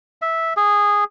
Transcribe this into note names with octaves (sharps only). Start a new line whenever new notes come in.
E5
G#4